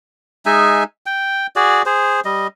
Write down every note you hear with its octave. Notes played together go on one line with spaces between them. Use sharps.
G#3 D#4 E5 G#5
G5
F#4 G#4 D5
G#4 C5
G3 D#5